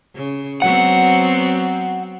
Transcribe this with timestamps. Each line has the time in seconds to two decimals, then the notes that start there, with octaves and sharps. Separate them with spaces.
0.15 C#3
0.62 F#3 B3 C4 F#5